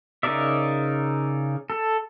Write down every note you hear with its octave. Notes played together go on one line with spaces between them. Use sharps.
C#3 D#4 A#4 D5 E5
A4